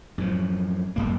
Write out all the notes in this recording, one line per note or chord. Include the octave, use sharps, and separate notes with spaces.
F#2 A2 F3
D1 G#1 F#2 A#3